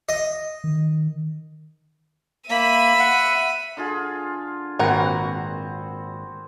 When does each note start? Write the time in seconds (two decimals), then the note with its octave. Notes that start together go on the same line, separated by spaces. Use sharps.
0.09 D#5
0.64 D#3
2.50 A#3 E5 B5 D#7
3.00 F#5
3.77 D3 F4 G#4
4.79 G#1 A#2 C4 F#4 A#4 B4 F#5